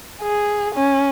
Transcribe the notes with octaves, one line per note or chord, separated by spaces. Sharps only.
G#4
C#4